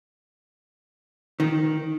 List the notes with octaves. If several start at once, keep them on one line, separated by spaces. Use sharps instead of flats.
D#3